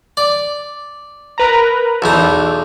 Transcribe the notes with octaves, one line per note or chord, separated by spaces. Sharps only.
D5
A#4 B4 A#5
B1 E2 D#4 E6